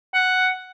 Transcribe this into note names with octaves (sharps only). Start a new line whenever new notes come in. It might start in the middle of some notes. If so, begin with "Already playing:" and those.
F#5